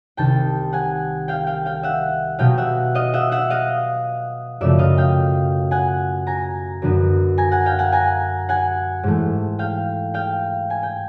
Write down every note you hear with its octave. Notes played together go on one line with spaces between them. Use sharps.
C2 C3 D#3 G5 A5
F#5 G#5
F5 G5
F5 G5
F5 G5
E5 F#5
B2 F#3 B3 F5 G5
E5 F#5
D#5 F5
E5 F#5
E5 F#5
D#5 F5
F#2 C#3 F3 A3 D5 E5
D#5 F5
F5 G5
F#5 G#5
G#5 A#5
F#2 D3 F#3 B3
G#5 A#5
F#5 G#5
F5 G5
F#5 G#5
G#5 A#5
F#5 G#5
G#2 E3 A3
F5 G5
F5 G5
G#5
G5